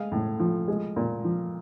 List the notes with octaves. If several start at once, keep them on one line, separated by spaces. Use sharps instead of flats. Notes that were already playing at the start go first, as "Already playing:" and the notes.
Already playing: G#3 F5
A2
F3
G#3
A#2
F3